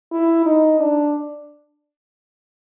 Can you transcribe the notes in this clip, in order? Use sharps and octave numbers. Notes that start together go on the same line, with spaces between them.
E4
D#4
D4